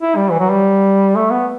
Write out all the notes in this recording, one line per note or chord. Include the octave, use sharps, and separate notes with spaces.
E4
G3
E3
F#3
G3
A3
B3